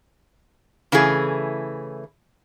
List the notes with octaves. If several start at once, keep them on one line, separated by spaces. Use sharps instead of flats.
C#3 E3 A3 G#4